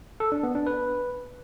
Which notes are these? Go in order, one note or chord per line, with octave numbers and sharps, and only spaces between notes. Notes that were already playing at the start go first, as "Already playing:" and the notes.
A4
D4
B3
D4
B4